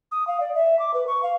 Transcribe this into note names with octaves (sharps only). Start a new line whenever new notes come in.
D#6
F5
D5
E5
D6
B4
C#6
F5